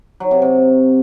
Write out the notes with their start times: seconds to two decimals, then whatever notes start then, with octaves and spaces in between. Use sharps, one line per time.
0.20 F#3
0.31 C3
0.42 C3